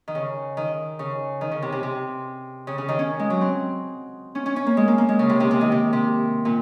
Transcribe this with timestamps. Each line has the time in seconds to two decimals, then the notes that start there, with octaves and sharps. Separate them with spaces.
0.08 D#3
0.15 C#3
0.57 D#3
0.99 C#3
1.41 D#3
1.51 C#3
1.62 C3
1.72 C3
1.83 C3
2.67 C#3
2.78 C#3
2.88 D#3
2.99 C#4
3.19 G#3
3.30 F#3
3.41 C4
4.35 C#4
4.46 C#4
4.56 C#4
4.66 A#3
4.77 G#3
4.88 A#3
4.98 A#3
5.09 G#3
5.19 C#3
5.29 C3
5.40 C3
5.51 C3
5.61 D#3
5.72 C3
5.93 C3
6.45 A#2